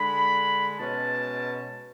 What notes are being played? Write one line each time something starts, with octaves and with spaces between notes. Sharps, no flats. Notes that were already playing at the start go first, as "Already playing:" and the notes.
Already playing: D3 G#3 D4 B5
B2 G#3 C#4 A5